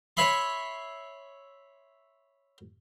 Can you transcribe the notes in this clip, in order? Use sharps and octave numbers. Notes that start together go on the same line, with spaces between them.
C#5 E5 B5 C6